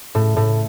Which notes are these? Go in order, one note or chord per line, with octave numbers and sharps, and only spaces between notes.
A2
A2